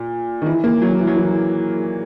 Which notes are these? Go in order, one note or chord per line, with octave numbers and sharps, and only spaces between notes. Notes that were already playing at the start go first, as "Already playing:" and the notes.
Already playing: A#2
D#3
E3
A#3
F#3
E3
F#3
E3